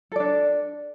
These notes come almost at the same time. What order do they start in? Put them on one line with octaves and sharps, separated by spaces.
A4 D5 D4